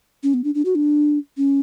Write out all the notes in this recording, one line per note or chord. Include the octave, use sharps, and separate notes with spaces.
C#4
B3
D4
D4
F#4
D4
C#4